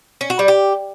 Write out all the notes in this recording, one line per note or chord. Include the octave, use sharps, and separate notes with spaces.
C#4
F#4
G3
G4